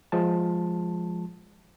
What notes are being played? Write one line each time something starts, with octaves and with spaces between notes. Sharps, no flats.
F3 G#3 A5